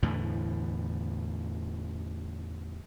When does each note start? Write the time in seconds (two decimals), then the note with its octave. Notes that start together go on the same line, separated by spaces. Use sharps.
0.03 E2 A2 D3 E3